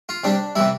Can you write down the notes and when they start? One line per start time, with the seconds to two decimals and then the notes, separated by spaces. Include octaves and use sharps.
0.09 F4
0.24 C3 G3 D4
0.56 C3 E3 G3 E4